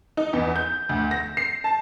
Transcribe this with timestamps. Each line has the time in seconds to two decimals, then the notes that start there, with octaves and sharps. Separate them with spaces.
0.17 D#4
0.33 E2
0.56 G6
0.89 D2
1.11 A#6
1.37 C7
1.64 A5